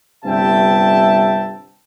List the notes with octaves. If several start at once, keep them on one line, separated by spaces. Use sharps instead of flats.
G1 G2 C3 E5 G5 A5